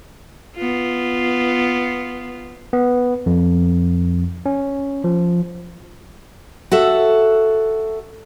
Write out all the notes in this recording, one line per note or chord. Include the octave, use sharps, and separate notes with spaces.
B3 F4
B3
F2
C#4
F3
F#4 A4 E5